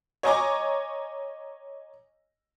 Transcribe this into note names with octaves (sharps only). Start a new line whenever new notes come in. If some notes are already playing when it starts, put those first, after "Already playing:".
C#5 D#5 G#5 A#5 C#6 D6